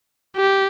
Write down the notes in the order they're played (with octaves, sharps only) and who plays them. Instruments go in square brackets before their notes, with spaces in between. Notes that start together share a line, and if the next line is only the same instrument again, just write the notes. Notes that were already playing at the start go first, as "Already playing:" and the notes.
[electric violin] G4